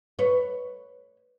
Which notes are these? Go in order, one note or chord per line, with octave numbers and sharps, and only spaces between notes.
B4 C#5